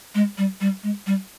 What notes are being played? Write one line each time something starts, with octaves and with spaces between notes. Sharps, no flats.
G#3
G3
G3
G#3
G3